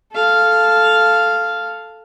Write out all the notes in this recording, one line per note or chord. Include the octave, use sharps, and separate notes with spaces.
A4 F5